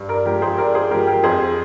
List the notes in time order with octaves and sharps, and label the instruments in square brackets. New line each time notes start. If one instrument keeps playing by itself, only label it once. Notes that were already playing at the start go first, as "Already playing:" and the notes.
Already playing: [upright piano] G2
A#4 D5
F3 G#3 G4 A#4
G#4 C5
G2 A#4 D5
G#4 C5
G#3 G4 A#4
F3
G4 A#4
F2 G#4 C5